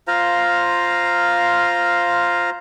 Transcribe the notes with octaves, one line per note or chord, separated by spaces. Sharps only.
F4 C5 F5 A#5